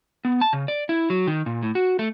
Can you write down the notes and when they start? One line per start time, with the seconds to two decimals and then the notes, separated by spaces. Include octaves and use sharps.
0.25 B3
0.41 A5
0.53 C#3
0.68 D5
0.89 E4
1.10 F#3
1.27 D#3
1.46 A#2
1.63 A2
1.75 F#4
1.99 A3